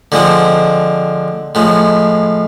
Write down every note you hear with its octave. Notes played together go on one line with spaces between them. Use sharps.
D3 F3 G#3 C4
A2 F3 G#3